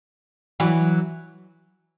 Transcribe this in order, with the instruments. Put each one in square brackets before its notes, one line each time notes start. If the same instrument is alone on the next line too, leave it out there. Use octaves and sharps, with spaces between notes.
[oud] E3 F#3